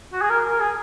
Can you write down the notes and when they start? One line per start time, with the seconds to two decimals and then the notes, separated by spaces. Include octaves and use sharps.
0.13 F#4
0.21 G#4
0.30 A#4
0.50 A#4
0.60 G#4